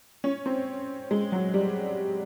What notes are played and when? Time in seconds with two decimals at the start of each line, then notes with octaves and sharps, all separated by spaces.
0.24 C#4
0.46 C4
1.11 G#3
1.32 F#3
1.54 G3